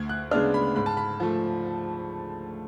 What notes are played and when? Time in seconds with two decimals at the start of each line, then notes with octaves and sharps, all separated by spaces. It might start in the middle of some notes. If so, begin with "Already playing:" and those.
Already playing: D2 G#6
0.09 F#6
0.31 C#3 G#3 B3 D4 F6
0.54 B5
0.76 G#2 B5
0.86 A5
0.97 B5
1.20 F3 A3